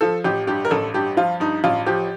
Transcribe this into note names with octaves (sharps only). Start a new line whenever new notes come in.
F3 A4
A1 G4
G2 G4
A#4
A1 A4
G2 G4
F3 F4
G2 D#4
A1 F4
F3 G4